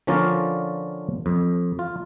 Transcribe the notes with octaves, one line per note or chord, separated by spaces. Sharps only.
D3 F3 C#4 F4 A#4 D5
F2
F4